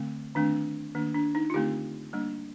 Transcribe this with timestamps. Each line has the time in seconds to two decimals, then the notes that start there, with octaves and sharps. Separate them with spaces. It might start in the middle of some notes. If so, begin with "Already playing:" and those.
Already playing: D3 A3 C4
0.35 D#3 A3 C4 D4
0.95 D#3 A#3 D4
1.14 D4
1.35 D#4
1.50 F4
1.54 D3 A3 C4 D#4 G4
2.13 G3 A#3 D4